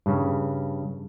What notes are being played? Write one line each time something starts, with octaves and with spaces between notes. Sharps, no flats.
G2 C#3